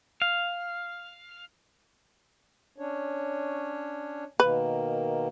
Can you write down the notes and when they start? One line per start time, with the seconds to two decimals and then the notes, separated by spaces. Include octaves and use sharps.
0.22 F5
2.78 C#4 D4 C#5
4.40 B2 D#3 A#3 B4